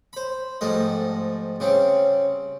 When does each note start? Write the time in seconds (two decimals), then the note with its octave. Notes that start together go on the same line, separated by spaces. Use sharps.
0.13 C5 B5
0.61 G#2 F3 G3 A3 D#5
1.60 C#3 G3 C4